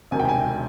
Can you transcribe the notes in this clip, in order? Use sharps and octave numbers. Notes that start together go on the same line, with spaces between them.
E1 D2 C3 D#3 G#5
G5
G#5